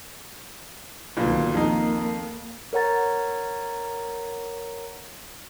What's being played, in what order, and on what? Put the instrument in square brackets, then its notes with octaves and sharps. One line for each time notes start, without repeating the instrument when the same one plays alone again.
[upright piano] G1 A#2 [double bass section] C2 D#3 F#3
[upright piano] F2 D#4 [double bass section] A#3
[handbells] A#4 C#5 F#5 A#5 A6